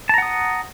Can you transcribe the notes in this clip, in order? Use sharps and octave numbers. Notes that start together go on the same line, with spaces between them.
F#5 A5 A#5 D#6